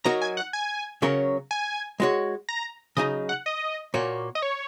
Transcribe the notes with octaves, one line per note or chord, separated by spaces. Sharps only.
F#3 D#4 F#4 A#4 A#5
G#5
F#5
G#5
C#3 F#3 C#4 A#4 C#5
G#5
G#3 F#4 C#5
A#5
C#3 F#3 D#4 D#5
F#5
D#5
A#2 A#3 F#4 C#5
D#5
C#5